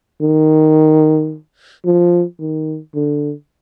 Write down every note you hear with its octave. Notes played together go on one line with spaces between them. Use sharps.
D#3
F3
D#3
D3